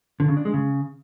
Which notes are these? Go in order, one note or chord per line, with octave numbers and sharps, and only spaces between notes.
D3
C#3
D4
G#3
C#3